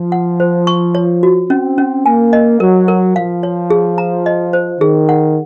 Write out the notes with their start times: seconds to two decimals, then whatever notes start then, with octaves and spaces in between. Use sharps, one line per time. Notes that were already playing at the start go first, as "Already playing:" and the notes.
Already playing: F3
0.12 F#5
0.40 C5
0.67 C#6
0.95 C#5
1.23 F#4
1.50 C4 C#4
1.78 C#4
2.05 A#3 G#5
2.33 D#5
2.60 F#3 A#4
2.88 A#4
3.16 F3 F5
3.43 C#5
3.70 G#4
3.98 A#5
4.26 D#5
4.53 C5
4.81 D#3 G#4
5.09 F#5